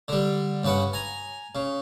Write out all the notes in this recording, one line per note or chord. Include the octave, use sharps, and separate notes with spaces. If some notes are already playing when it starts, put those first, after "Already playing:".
D3 G3
G2 C#3 B4 F#5
G#5 A#5
C#3